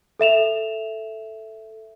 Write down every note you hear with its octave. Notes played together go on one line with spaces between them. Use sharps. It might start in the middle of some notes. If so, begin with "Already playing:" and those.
A4 E5 E7 F7